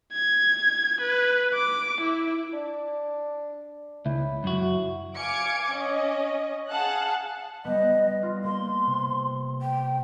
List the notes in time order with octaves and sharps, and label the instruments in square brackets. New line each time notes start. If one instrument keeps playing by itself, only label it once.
[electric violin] G#6
B4
D6
E4
[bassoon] D4
[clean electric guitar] C#2 [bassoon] E4
[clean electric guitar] F#2 F#4
[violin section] F5 G#5 D6 G#6 C#7 D7
C#4 D#5
G#4 F5 F#5 A5 F#6
[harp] G3 B3 [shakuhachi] D#5
[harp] F4
[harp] A#3 [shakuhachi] C6
[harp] C3
[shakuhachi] G5